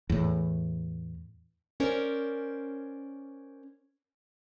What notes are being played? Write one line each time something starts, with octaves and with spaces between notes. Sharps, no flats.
E2 A2
C#4 A#4 C5 D5